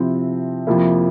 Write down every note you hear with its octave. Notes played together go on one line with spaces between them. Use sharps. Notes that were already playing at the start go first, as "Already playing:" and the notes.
Already playing: C3 F3 C4 E4
F2 C3 F3 A#3 E4